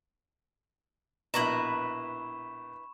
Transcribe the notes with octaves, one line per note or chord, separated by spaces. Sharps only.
A#1 B2 E4 B4 A#5 B5 C#6 E7